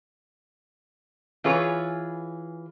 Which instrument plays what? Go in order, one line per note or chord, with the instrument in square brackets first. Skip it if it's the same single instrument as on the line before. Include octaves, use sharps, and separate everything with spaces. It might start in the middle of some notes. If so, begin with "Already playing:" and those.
[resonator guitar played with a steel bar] E3 F4 G#4 B4 C#5